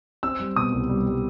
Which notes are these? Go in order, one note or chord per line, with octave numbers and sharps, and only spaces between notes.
C4 E6
G3
B2 D#6
C2
G3
G3